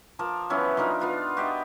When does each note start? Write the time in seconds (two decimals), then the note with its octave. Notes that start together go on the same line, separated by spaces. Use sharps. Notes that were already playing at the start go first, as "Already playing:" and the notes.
0.19 F3 A#4 A5 D6
0.50 E3 F#3 B3 C#4
0.77 F3 D4 D#4 A#4
1.00 B3 F4 B4
1.37 F#4 G4 D#5 E5